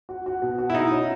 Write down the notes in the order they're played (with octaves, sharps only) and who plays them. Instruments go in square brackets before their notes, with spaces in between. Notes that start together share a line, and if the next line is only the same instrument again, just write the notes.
[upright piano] F#4
F#4
B2
F#4
[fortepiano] E4
[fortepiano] D#4 [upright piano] F#4
[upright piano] C#4